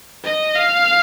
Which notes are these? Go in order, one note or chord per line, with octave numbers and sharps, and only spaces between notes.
D#5
F5